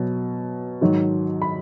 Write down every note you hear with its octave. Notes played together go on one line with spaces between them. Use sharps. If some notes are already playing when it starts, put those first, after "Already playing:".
Already playing: B2 F#3
G#2 D#3 F#3
B5